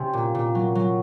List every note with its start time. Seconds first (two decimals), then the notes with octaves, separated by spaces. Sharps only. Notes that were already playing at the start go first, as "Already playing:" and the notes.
Already playing: C3 C#4
0.13 A#2
0.35 A#2
0.55 F#3
0.75 F#3